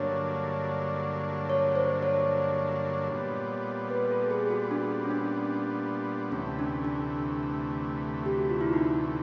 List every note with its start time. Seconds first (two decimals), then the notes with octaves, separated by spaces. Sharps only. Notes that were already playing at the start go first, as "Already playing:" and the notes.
Already playing: G2 D3 F#3 A#3 D4 C#5
1.49 C#5
1.75 C5
2.03 C#5
3.10 A#2 G3 B3
3.90 B4
4.11 A4
4.31 G#4
4.50 F#4
4.71 D4
5.04 C#4
5.11 D4
6.31 D2 C3 E3 A3 C#4
6.59 D4
6.84 D4
8.26 G4
8.37 F#4
8.50 F4
8.61 E4
8.73 D#4